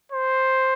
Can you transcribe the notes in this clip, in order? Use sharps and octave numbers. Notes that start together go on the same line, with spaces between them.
C5